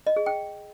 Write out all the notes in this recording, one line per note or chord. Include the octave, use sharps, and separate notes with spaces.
D#5
G#4
G5